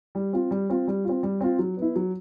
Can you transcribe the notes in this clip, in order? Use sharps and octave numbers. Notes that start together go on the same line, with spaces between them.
G3
C4 F4
G3
C4 F4
G3
C4 F4
G3
C4 F4
F#3
B3 E4
F#3